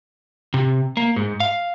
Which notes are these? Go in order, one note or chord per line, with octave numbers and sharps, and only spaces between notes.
C3
A#3
G#2
F5